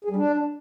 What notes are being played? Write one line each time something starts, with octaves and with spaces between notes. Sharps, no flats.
G#4
G3
D4